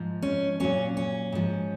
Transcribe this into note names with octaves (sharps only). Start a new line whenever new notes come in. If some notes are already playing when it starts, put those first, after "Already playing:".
Already playing: G#2 F3
C#4
A#2 F#3 C#4
C#4
G#2 F3